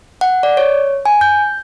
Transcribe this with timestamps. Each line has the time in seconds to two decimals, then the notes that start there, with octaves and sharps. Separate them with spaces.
0.21 F#5
0.43 D5
0.57 C#5
1.06 G#5
1.21 G6